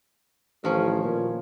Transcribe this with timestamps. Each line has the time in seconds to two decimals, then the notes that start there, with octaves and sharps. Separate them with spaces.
0.64 A1 D#3 F3 C#4
1.04 A#2